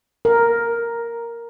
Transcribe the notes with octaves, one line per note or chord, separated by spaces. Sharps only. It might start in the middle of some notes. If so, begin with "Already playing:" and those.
A#4